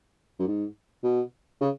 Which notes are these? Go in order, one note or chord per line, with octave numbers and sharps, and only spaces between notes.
F#2
G#2
B2
C#3